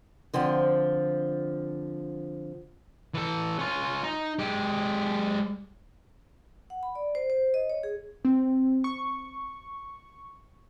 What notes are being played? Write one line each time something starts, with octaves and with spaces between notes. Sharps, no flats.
D3 F3 C4 F4
E3 A4
C#4 F4
D#4
G#3 G4
F#5
B5
D5
C5
C5
D#5
C#5
G#4
C4
C#6